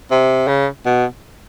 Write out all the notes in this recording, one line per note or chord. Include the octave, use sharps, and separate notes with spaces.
C3
C#3
B2